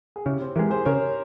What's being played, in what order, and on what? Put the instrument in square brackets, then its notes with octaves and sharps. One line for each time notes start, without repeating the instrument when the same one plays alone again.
[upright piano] G#4
[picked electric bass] C#3 [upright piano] E4 G4
[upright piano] C4
[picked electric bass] E3 G#3 [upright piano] G4 A#4
[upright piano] G#4 C5
[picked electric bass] C#3 [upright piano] A#4 C#5